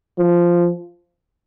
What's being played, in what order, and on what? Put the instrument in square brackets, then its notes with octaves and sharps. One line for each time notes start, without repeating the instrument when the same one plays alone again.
[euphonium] F3